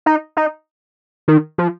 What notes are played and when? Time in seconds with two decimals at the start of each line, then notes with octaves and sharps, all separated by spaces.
0.06 D#4
0.37 D#4
1.28 D#3
1.58 F3